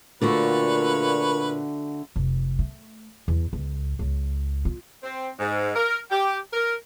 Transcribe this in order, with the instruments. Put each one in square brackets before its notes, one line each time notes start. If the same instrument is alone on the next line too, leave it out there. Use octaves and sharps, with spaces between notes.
[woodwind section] A#2 [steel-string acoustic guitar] D3 A3 F#4 [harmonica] B4 C#5
[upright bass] F1
A3
E2
C#2
C#2
F4
[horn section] C4
G#2
A#4
G4
A#4